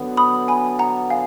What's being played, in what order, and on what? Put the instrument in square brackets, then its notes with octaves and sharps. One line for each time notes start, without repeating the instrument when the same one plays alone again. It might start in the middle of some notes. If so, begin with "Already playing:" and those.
Already playing: [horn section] D3 F#3 B3
[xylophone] B5 D#6
G#5 B5
F#5 A#5
F5 G#5